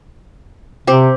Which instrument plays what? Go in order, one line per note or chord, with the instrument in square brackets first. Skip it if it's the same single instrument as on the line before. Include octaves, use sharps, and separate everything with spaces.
[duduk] C3 [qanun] C4 G4